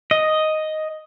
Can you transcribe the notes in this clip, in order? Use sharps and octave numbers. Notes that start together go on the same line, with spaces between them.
D#5